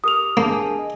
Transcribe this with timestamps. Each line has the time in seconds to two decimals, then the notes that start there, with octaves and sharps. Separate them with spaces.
0.04 G4 A#4 D#6 F7
0.37 A#3 D4 G#4 F5
0.50 G#5
0.79 D#5